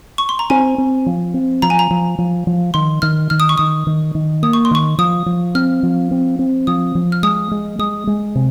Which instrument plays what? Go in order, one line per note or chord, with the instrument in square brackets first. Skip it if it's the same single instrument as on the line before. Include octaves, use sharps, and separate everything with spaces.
[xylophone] C#6
C6
A#5
[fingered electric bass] C4 [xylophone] G#5
[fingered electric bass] C4
F3
C4
[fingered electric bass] F3 [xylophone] A#5
[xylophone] G#5
A#5
[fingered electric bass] F3
F3
F3
[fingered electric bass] D#3 [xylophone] C6
[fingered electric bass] D#3 [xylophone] F6
[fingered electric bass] D#3 [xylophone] F6
[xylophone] D#6
C#6
[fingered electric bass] D#3 [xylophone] D#6
[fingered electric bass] D#3
D#3
[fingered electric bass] A#3 [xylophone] D#6
[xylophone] C#6
C6
[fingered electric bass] D#3 [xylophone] C#6
[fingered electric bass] F3 [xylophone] D#6
[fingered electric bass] F3
[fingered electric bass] C4 [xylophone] F6
[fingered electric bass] F3
C4
C4
[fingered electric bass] F3 [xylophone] D#6
[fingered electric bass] F3
[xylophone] F6
[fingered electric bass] G#3 [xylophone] D#6
[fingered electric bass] G#3
[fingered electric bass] G#3 [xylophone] D#6
[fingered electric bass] G#3
C3